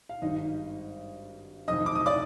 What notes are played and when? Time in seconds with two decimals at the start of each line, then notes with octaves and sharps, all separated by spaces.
0.09 F5
0.22 G#1 G2 D#3 D#4 D#5
1.68 F1 F2 D#3 D#5 D#6
1.86 D6
1.95 D#6
2.06 D5 D6